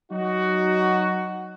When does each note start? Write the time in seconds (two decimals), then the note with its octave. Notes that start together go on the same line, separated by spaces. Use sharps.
0.11 F#3 D#4 F#4